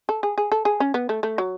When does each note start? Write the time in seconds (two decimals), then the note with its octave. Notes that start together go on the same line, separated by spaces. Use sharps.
0.09 A4
0.23 G#4
0.38 G#4
0.52 A4
0.65 G#4
0.80 C#4
0.94 B3
1.09 A3
1.23 A3
1.38 F#3